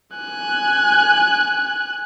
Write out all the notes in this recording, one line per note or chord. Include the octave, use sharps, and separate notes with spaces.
G#5 F#6